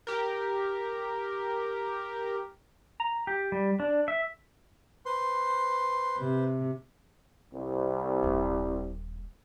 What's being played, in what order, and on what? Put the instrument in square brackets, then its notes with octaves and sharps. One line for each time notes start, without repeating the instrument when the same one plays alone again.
[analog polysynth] G4 A#4
[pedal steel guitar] A#5
G4
G3
D4
E5
[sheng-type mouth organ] B4 C5 [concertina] C6
[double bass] C3
[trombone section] C2
[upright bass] D#1 C4